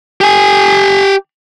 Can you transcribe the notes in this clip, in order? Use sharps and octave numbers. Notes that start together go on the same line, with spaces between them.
G4 G#5